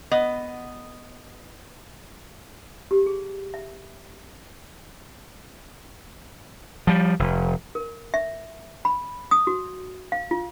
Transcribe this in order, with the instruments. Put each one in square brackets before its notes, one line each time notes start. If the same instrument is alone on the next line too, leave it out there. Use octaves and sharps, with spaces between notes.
[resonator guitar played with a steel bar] B3 D#5
[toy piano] G4
G#4
E5
[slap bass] F3 G3
F1
[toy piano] A#4
E5
B5
D#6
F#4
F5
F4